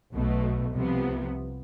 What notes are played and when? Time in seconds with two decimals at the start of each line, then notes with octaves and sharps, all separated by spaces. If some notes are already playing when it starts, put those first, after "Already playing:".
0.14 B1 B2 A3
0.74 C2 C3 F3 B3